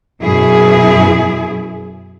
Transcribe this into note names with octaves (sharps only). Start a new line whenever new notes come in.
F#2 B2 E4 G#4